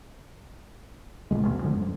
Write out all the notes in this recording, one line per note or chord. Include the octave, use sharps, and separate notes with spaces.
A1 A#2 C#3 G#3
A1 D2 B2
D3 E3 F3 G#3
F#2